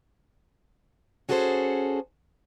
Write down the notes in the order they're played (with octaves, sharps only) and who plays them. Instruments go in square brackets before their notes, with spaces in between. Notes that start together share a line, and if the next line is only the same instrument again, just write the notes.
[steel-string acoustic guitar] C#4 F#4 G#4 A4 B4 C5